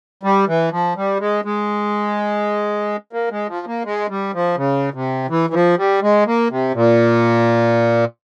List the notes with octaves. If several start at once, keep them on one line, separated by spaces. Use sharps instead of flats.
G3
E3
F3
G3
G#3
G#3
A#3
G#3
F3
A#3
G#3
G3
F3
C#3
C3
E3
E3
F3
G3
G#3
A#3
C3
A#2